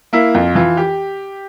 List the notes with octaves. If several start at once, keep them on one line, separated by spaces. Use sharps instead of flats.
A#3 E4
F2 F4
E3 F4
G4